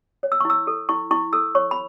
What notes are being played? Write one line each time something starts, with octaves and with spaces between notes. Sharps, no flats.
C#5
E6
C#6
E4 E6
A4
E4 C#6
E4 C#6
A4 E6
C#5 C#6
B5